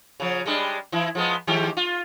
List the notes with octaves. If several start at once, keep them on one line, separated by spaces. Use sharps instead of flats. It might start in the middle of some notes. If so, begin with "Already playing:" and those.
C#3 F3
G3 G#3 D4
E3 E4
F3 G#3 B3
D#3 G#3 G4
F4